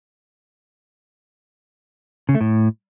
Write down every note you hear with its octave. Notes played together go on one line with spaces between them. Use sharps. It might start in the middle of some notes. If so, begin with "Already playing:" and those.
C#3
A3
A2